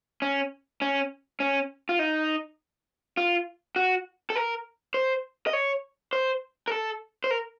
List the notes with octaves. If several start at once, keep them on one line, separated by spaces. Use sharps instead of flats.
C#4
C#4
C#4
F4
D#4
F4
F#4
A4
A#4
C5
D#5
C#5
C5
A#4
A4
C5
A#4